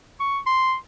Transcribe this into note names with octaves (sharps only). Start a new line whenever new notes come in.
C#6
C6